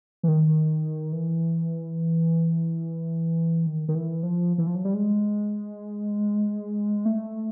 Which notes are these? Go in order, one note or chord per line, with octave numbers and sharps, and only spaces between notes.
E3
D#3
E3
D#3
D#3
E3
F3
E3
F3
F#3
G3
G#3
A3